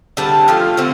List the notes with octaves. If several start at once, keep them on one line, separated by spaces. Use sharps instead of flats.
D3 G3 C4 A5
F3 A3 F4
D3 A3 C4